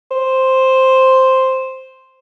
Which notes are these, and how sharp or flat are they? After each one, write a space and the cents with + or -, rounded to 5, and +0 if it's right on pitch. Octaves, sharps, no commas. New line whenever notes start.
C5 +0